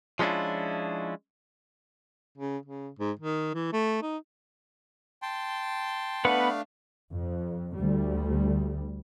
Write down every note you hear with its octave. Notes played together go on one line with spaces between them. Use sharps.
F3 G#3 C#4 D4 E4 F4
C#3
C#3
G#2
D#3
E3
A3
D#4
G5 A5 C6
A3 B3 D4 B4 F5 F#5
F2
D2 G3